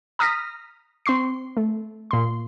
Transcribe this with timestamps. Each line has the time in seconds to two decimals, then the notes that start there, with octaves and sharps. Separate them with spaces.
0.19 A#5 D#6 F6 A#6 B6
1.06 C4 C6 C#6 C7
1.57 A3
2.11 A#2 C6